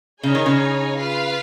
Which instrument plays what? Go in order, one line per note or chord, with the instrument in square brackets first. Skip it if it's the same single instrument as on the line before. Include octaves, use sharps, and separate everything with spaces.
[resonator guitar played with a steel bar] C#3 [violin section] D#4 G#4 C#5 G#5
[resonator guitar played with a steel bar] D#3
C#3
[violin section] F4 B4 F5